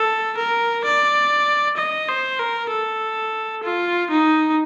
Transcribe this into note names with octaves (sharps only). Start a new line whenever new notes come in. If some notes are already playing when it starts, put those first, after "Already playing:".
Already playing: A4
A#4
D5
D#5
C5
A#4
A4
F4
D#4